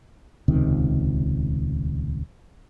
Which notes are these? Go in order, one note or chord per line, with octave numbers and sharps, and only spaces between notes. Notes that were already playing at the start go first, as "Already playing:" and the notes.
D#1 C#2 C3 D#3